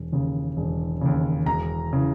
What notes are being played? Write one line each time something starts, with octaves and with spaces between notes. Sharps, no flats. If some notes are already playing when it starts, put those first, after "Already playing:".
Already playing: E1
D#2 C#3
E1
D#2 C#3
E1 A#5
C#3 E3